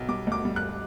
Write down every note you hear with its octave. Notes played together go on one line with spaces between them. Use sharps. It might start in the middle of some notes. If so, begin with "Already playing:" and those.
Already playing: B1
G3 D6
D2 D6
G3
F#6